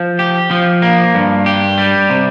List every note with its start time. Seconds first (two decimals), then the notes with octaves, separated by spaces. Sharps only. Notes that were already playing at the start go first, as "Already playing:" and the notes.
Already playing: F3
0.19 G4
0.51 F3
0.82 A#3
1.14 G2
1.46 G4
1.78 G3
2.10 C3